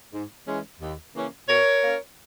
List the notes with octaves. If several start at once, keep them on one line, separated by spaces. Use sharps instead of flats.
G#2
E3 G#3 C#4
D#2
C#3 E3 A#3 C#4
B2 A#4 C#5
A#3 C#4